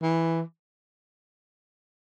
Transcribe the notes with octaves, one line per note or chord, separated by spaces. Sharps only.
E3